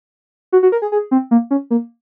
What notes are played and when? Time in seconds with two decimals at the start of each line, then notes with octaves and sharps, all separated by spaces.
0.52 F#4
0.63 F#4
0.72 A#4
0.82 G#4
0.92 G#4
1.11 C4
1.31 A#3
1.51 C#4
1.71 A#3